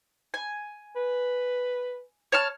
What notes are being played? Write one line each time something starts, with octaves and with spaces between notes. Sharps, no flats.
G#5
B4
C#5 A5 F6